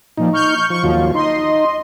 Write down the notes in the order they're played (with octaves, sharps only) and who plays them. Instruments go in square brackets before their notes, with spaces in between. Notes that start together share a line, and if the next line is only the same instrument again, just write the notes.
[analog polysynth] A#2 F3 [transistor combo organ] D#4
[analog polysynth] C#6 F6 G6
[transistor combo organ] F3 [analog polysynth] C#6
[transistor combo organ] D#2 F#3 F4 [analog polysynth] F3
[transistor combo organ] D#4 [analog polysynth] D#5 C6